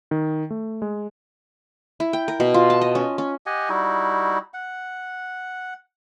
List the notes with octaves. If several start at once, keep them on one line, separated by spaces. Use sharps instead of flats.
D#3
A3
G#3
E4
G5
A#4
B2
F4
A5
D#5
C#4
C#4
G4 D#5 F#5 G#5
G3 D#4 E4 F#4
F#5